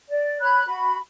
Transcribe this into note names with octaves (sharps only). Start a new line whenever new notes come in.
D5
C#5 B5 F#6
F#4 B5